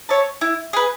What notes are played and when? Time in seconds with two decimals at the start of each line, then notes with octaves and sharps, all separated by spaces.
0.09 C#5 E5 A5
0.41 E4
0.73 G#4 B4